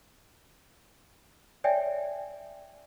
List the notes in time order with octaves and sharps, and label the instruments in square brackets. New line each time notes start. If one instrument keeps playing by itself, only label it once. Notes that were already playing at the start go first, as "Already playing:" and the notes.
[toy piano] C#5 D5 E5 G5 G#5